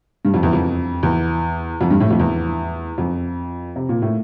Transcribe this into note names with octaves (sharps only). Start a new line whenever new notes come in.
G2
F2
E2
F2
E2
F2
G2
A2
F2
E2
F2
C3
A#2
A2